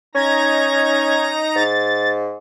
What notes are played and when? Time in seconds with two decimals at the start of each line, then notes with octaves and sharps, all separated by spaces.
0.15 C#4 D#4 A#5 G#6 A#6
1.56 G#2 A6